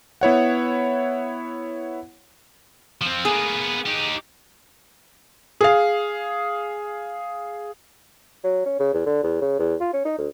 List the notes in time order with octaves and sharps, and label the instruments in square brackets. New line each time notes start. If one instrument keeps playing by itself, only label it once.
[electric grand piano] B3 E4 C#5 F#5
[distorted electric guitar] F3 C4
[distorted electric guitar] A#3 B3 [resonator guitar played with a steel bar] G#4
[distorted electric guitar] D#4 G4
[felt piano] G#4 F5
[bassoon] F#3
C#4
C#3
E2
D3
E2
C#3
E2
F4
C#4
D#4
D2